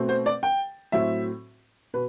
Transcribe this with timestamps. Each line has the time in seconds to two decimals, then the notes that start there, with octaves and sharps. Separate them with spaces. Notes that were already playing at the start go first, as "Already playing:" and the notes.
Already playing: B2 A3 C4
0.09 C5
0.26 D5
0.43 G5
0.92 A2 F#3 C4 E5
1.94 B2 B4